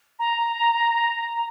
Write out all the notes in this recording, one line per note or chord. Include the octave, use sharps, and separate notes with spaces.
A#5